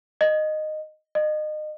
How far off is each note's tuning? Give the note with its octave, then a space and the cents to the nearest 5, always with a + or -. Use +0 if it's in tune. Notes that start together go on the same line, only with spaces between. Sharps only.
D#5 -10
D#5 -30